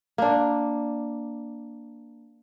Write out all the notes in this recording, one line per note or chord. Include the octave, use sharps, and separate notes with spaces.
A#3 D4